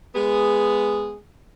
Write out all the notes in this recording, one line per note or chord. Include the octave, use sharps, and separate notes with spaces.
G#3 B3 G#4